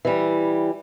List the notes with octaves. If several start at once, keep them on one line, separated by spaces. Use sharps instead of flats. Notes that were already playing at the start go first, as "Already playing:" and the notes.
E3 G3